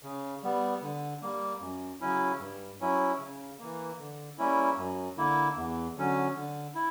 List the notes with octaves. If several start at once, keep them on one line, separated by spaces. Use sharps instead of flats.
C#3
G3 B3
D3
G3 A#3
F#2
C#3 F#3 C#4 E4
G2
F#3 C#4 E4
C#3
E3 A#3
D3
G3 A#3 C#4 E4
F#2
D3 A#3 E4
E2
D3 F#3 C#4
D3
E4